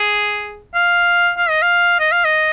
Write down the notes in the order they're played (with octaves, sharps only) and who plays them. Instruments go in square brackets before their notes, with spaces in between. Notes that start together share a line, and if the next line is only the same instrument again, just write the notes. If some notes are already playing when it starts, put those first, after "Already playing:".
Already playing: [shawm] G#4
F5
F5
D#5
F5
D#5
F5
D#5